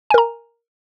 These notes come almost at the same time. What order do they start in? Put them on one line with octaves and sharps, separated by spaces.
G#5 A#4 A#5